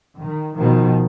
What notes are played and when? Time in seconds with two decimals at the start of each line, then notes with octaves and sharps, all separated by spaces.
0.19 D#3
0.57 B2 D#3 F3